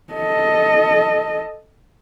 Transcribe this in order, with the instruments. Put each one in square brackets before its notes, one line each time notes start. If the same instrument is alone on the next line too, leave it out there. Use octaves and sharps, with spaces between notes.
[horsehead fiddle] A4 D#5